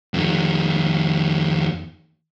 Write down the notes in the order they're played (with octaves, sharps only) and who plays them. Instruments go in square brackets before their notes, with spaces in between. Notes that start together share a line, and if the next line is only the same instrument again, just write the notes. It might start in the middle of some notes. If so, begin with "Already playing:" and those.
[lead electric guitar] F2 D#3